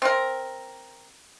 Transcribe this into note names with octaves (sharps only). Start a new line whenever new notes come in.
C4 A#4